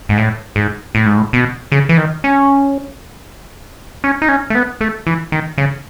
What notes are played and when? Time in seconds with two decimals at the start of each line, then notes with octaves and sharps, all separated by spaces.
0.09 G#2
0.18 A2
0.56 G#2
0.95 A2
1.06 G#2
1.17 A2
1.33 B2
1.72 C#3
1.89 E3
1.97 D#3
2.24 C#4
4.04 C#4
4.22 D#4
4.29 C#4
4.50 A3
4.55 B3
4.81 A3
5.07 E3
5.32 D#3
5.58 C#3